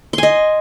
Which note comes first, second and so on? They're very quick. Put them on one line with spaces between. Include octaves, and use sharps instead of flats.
C6 G#5 D#5